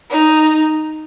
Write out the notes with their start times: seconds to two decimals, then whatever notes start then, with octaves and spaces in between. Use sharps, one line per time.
0.11 D#4